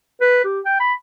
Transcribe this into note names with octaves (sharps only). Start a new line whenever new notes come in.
B4
G4
G5
B5